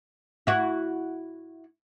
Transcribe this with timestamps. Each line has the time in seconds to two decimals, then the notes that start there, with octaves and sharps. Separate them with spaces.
0.47 E4 F#4